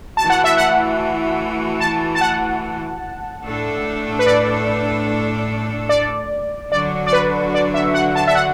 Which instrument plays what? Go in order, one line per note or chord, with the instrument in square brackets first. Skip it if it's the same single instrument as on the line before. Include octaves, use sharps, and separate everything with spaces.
[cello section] E3 A3 F#4 [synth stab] A5
[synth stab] F#5
E5
F#5
A5
A5
F#5
[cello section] A2 A3 D4 A4
[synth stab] B4
D5
D5
[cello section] D3 F#3 D4 F#4 [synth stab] D5
[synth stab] D5
B4
D5
E5
F#5
A5
E5
F#5